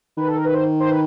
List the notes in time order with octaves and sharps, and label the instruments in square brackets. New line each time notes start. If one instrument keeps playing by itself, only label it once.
[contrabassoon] D#3 [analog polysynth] B4
[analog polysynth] A4
A#4
B4
C5
C5
B4